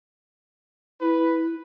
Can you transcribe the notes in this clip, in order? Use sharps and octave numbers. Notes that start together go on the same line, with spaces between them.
E4 B4